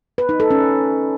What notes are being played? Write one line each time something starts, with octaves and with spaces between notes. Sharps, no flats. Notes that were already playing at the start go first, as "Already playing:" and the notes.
B4
D#4
A4
C#4